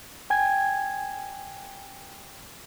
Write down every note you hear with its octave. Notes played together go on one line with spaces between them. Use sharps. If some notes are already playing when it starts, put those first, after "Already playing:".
G5 G#5 G#6